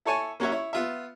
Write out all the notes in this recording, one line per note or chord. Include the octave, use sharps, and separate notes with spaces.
E4 A4 C#5 G#5 A5 C#6
A#3 C#4 F#4 C#5 E5
E4 C#5
B3 F4 E5